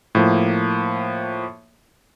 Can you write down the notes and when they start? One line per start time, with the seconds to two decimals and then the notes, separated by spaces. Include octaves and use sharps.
0.15 A2 F3 A#3